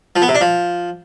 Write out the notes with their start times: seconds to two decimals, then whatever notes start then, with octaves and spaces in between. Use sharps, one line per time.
0.16 F3
0.22 B3
0.28 C3
0.35 D4
0.41 F3